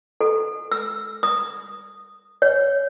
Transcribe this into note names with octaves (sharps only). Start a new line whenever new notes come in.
A4
E6
D#6
C#5